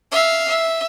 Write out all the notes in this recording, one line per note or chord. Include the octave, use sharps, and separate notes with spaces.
E5 F5
E5